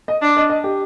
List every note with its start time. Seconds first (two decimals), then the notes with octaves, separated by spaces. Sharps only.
0.08 D#5
0.22 D4
0.37 D#5
0.49 D#5
0.64 G4